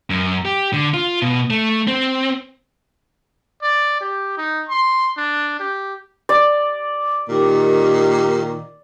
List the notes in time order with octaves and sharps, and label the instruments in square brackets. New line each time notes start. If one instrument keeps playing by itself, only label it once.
[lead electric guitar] F#2
G4
D3
F4
B2
A3
C4
[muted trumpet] D5
G4
D#4
C6
D4
G4
[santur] D5
[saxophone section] A#2 D#3 [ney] G4